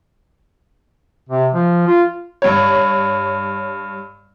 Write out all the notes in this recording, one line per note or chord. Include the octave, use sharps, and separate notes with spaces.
C3
F3
F4
G2 C#5